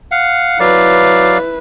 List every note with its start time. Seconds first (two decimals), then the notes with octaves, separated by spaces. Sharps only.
0.12 F5 F#5
0.60 F#3 E4 B4 D5 F5